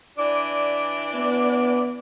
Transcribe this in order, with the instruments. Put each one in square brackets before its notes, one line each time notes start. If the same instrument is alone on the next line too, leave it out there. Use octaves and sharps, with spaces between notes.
[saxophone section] E3 D4 D5
[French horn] B3